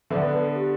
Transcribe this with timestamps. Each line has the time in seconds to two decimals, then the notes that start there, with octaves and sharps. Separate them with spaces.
0.10 D3 B3 D4 B4 E5
0.23 B4
0.33 A4
0.45 A4
0.56 G4